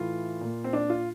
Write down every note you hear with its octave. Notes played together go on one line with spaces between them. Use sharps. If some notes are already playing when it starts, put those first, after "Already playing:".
Already playing: A2 E3 F4
A#2
C4
D4
F4